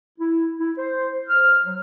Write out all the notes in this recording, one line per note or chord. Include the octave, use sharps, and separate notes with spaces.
E4
E4
C5
F6
F#3